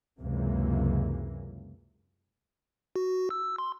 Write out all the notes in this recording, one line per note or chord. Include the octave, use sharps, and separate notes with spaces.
C#2 F#2 C3 E3 A#3
F#4
E6
C6